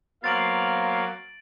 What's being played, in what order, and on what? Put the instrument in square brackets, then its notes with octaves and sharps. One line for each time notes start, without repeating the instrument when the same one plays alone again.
[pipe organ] F#3 A#3 [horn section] B3 C5 F5 [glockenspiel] A6 D7 F#7